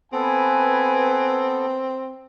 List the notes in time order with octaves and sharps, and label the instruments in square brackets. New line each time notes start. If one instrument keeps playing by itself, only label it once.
[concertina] B3 A4 [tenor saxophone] C4 [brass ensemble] B4 G#5